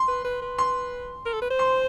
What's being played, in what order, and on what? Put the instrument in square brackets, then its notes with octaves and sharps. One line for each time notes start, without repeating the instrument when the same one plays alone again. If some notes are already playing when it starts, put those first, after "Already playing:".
Already playing: [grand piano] C6
[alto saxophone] B4
B4
B4
[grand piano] C6
[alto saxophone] A#4
A4
B4
C5
[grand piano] C6